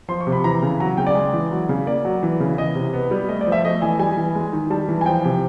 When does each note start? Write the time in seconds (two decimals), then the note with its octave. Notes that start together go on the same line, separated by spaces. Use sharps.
0.09 F3 C6
0.21 C#6
0.27 C3
0.32 B5
0.44 E3 A#5
0.62 C#3
0.80 F#3 A#5
0.97 C#3 G5
1.07 D5
1.15 G#3
1.33 E3
1.51 F#3
1.69 C#3
1.86 A#3 D5
2.05 F#3
2.23 E3
2.40 C#3
2.58 E3 D#5
2.75 C3
2.93 B3
3.11 G3
3.28 A3 D#5
3.41 D5
3.47 F3
3.52 E5
3.65 A3 D#5
3.82 E3 G#5
3.99 G3 G#5
4.17 E3
4.35 G#3
4.53 D#3
4.70 G3 A5
4.89 E3
5.01 G#5
5.06 F3 G5
5.25 C3